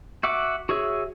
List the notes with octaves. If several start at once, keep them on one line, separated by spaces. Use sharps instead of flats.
F#4 E5 F#5 D6
F#4 G#4 C#5 E5